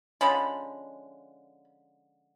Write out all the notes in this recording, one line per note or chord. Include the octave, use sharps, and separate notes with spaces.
D3 F3 G#3 C#4 B5